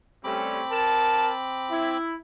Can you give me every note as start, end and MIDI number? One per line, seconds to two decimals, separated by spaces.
0.24 0.61 55
0.24 0.61 57
0.24 1.97 60
0.24 0.61 61
0.24 1.97 83
0.24 1.97 86
0.71 1.31 70
0.71 1.31 81
1.70 2.15 64